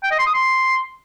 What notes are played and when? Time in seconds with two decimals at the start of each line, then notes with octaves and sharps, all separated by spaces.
0.04 G5
0.11 D#5
0.19 C6
0.26 D#6
0.34 C6